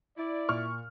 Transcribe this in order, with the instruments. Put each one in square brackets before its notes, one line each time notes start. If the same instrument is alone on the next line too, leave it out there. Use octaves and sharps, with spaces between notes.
[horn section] E4 D5
[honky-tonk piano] A#2 C#6 F6